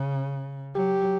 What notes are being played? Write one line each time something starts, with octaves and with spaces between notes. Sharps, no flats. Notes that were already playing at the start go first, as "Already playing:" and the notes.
Already playing: C#3
F#3 G4